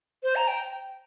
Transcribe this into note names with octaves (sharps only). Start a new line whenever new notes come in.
C5
A#5
G5